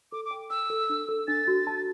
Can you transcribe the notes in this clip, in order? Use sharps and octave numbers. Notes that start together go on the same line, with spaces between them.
A4 D6
D6
G5
G5 E6
A4
D4
A4
D4 A6
F#4
A5